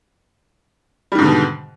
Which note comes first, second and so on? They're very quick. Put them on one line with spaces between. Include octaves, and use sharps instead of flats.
G3 D#3 G#2 D3 B2